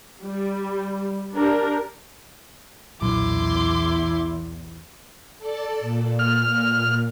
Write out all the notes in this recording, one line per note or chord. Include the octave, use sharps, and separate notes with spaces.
G3
D4 G4 A#4
B1 E2 A#2 F#3 E4 C6 D6
A4 D5 A5
A#2
F6